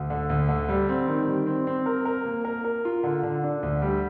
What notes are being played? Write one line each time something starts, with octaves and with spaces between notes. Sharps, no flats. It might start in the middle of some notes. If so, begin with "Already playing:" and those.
Already playing: D2
D3
D2
D3
G3
C4
D#3
G3
C4
C4
A#4
A#4
A#3
A#4
A#4
F4
D3
D3
D4
D2
G3